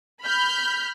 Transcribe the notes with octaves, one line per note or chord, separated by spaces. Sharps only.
B5 F6 G6